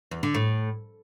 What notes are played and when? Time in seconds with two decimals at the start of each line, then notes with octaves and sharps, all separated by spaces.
0.11 E2
0.23 D3
0.34 A2